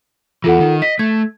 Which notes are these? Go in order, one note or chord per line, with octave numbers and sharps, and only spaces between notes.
E2 E3 F4 A4 F#5
D#3
D#5 B6
A3 G#6